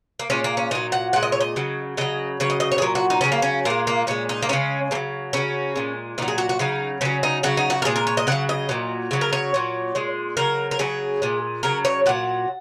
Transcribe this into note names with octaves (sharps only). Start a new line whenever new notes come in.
A#3
A#2 G#3 C#4
A#3
C#4
A#2 F#3 D#4
F#5
A#2 G#3 F#5
D#5
C#5
D#5
C#3 F#3
C#3 F#3 D#5
C#3 F#3 C#5
D#5
D#5
C#5
G#4
A#2 F#3 A#4
F#4
D#4
C#3 F#3 C#4
A#3
C#4
A#2 G#3 A#3
A#3
A#2 G#3 C#4
D#4
A#3
C#3 G#3 C#4
C#3 F#3 A#3
C#3 F#3 C#4
A#2 G#3
A#2 F#3 D#4
G#4
F#4
F#4
C#3 F#3 D#4
C#3 F#3 C#4
D#4
C#3 F#3 F#4
D#4
F#4
A#4
A#2 G#3 G#4
A#4
C#5
D#5
C#3 F#3 F#5
D#5
A#2 F#3
C#3 F#3
A#4
C#5
A#2 F#3
A#2 G#3
C#3 F#3 A#4
A#4
C#3 F#3 G#4
A#2 G#3
C#3 F#3 A#4
C#5
A#2 F#3 F#5